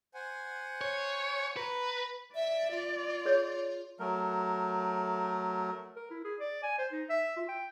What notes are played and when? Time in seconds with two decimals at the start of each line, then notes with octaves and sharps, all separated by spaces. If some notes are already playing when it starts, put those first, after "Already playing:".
0.14 C5 F#5 G#5
0.81 C#5
1.57 B4 A#5
2.35 D5 E5
2.71 F4
3.25 G#4 C#5
4.00 F#3 A3 A#4
5.97 A#4
6.11 E4
6.25 G#4
6.40 D5
6.63 G#5
6.79 C5
6.92 D#4
7.10 E5
7.37 F4
7.49 G5